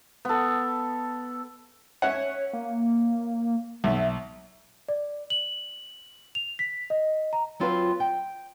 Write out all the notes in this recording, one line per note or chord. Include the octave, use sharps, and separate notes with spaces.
B3 A4
C#4 C#5 E5 F#5
A#3
B1 E5
D5
F#7
F7
B6
D#5
A#5
F#3 C4 F4 F#4 A4 B4
G5